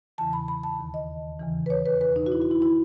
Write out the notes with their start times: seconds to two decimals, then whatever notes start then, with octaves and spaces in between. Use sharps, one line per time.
0.18 E2 C#3 E3 A5
0.33 B5
0.48 B5
0.64 A5
0.79 D#2 D#3
0.94 D#5
1.40 E2 C#3 E3
1.66 B4
1.70 C#5
1.86 B4
2.01 E2 B2 B4
2.16 D#4
2.26 F#4
2.32 E4
2.42 F#4
2.51 E4
2.62 D#3 E4